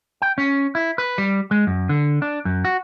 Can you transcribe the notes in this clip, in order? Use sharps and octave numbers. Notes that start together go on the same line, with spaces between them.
G5
C#4
E4
B4
G3
G#3
F#2
D3
D4
F#2
F#4